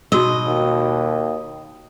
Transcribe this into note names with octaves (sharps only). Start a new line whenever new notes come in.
B2 D#4 F#4 D#5 E6
D#2